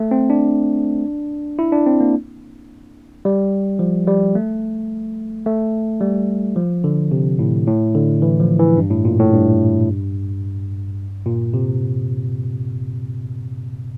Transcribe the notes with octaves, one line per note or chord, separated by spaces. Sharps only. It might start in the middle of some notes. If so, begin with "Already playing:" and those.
Already playing: A3
C4
D4
E4
D4
C4
A#3
G3
F3
G3
A3
A3
G3
F3
D3
C3
A2
A2
D3
E3
F3
E3
G2
A2
A#2
A2
G2
A#2
C3